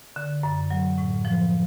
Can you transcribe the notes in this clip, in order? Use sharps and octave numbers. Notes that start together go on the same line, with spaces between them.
D3
F#2
F#3
A2
F3